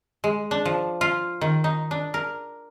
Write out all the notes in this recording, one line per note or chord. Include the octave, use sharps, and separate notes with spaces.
G#3
D4
F3
F4
D#3
D#4
D4
A#4